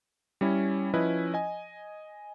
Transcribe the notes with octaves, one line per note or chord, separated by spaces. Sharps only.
G3 C#4 E4
F3 C#4 E4 B4 D#5
D#5 G#5